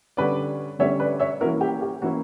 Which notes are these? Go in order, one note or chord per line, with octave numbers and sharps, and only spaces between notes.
D3 G3 C#4 B4 D5
D3 G3 C#4 C#5 E5
B4 D5
C#5 E5
E3 A#3 C#4 E4 F#4 A#4
G4
G4
E3 A#3 C#4 E4 F#4